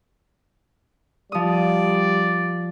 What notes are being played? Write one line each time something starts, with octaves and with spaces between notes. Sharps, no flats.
F3 G3 D5 D#6